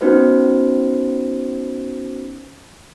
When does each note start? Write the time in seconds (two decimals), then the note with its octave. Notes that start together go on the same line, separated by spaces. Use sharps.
0.01 B3 C#4 D#4 F#4 B4 C5